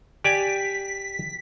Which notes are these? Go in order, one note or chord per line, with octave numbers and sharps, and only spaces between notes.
G4 D5 G#5 B6